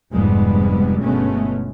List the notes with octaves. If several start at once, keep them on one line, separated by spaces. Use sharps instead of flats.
F1 F2 G#2 G3 G#3 B3
G1 B2 G#3 A3 B3 C#4